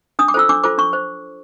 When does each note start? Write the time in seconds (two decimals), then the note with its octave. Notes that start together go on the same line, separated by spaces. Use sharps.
0.19 D4 D#6
0.28 D6
0.34 F4 A4 C5 E6
0.49 D4 D6
0.64 F4 A4 C5 D6
0.78 D4 C#6
0.93 C5